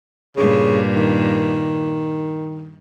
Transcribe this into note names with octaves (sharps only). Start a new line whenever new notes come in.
G2 A#2 C#3
D#3